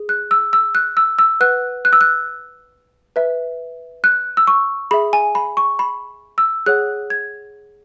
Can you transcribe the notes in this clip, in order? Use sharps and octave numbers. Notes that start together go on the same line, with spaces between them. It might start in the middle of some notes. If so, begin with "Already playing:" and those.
Already playing: G#4
F#6
E6
E6
F#6
E6
E6
B4 F#5 F#6
F#6
E6
F#6
B4 E5
F#6
E6
C#6
G#4 E5 B5
G#5
B5
C#6
B5
E6
G#4 C#5 F#5 F#6
G#6